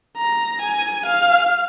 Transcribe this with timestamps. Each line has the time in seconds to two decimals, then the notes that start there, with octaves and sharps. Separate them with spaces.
0.17 A#5
0.62 G#5
1.06 F5